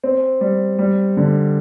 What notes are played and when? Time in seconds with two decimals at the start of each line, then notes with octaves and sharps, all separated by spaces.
0.04 C4
0.41 G3
0.79 G3
1.17 D3